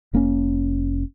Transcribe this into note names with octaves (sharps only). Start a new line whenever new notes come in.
F1 A#3 C4 C#4